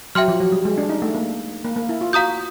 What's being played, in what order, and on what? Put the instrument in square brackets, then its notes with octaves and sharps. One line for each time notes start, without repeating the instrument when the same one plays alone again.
[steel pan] F#3 [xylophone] E5 G5 C6 F6
[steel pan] F3
F#3
G3
G#3
D4
D#4
A3
A#3
A#3
A#3
E4
F4
[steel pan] F#4 [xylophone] F5 A#5 D#6 G6